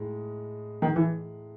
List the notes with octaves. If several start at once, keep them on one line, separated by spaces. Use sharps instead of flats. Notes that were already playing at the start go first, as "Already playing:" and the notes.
Already playing: A2 G#3 D#4
D#3
E3